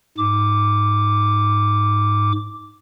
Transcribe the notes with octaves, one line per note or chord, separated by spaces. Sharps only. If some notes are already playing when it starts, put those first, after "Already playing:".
G#2 D6